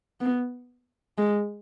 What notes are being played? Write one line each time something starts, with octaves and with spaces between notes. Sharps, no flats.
B3
G#3